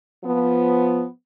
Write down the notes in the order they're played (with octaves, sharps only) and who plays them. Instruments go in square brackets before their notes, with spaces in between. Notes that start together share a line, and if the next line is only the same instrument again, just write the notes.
[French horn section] F3 B3